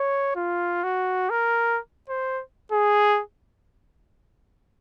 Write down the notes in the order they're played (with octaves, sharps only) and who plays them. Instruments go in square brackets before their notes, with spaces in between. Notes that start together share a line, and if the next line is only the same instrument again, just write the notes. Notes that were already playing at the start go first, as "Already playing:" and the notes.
Already playing: [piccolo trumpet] C#5
F4
F#4
A#4
C5
G#4